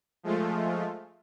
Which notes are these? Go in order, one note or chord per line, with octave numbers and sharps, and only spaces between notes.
F3 G#3 A3 F4